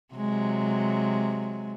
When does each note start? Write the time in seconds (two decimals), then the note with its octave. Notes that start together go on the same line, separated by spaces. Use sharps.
0.15 C3 F#3 G#3